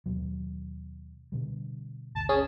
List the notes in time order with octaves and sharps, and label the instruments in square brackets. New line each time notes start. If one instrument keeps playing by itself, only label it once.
[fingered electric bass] D#2 B2 F#3
B2 D3 G3
[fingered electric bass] G1 D2 [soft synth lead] A5
[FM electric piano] C#4 [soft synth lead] G#4